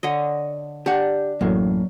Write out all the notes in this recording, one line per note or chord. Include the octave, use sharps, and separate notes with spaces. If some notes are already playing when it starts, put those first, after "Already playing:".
D3 C#5 D#5
D4 G4 F#5
A1 F#2 A2 F#3 A#3